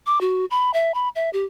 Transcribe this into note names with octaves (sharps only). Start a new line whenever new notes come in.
D6
F#4
B5
E5
B5
E5
G4